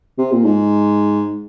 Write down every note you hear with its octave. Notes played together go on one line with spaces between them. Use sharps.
C3
A#2
G#2